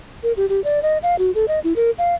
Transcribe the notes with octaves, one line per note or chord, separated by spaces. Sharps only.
A#4
G4
G4
D5
D#5
F5
F#4
A4
D#5
E4
A#4
F5